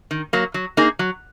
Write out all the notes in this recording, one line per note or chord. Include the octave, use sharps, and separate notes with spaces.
D#3
F#3 A#3
F#3
A#3 D#4 G#4
F#3